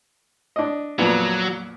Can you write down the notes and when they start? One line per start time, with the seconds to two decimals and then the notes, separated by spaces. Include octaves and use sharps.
0.56 D4 D#5
0.99 F2 A#2 F#3 B3